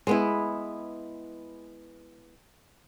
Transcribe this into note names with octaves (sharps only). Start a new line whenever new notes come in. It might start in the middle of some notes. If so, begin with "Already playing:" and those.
G#3 B3 E4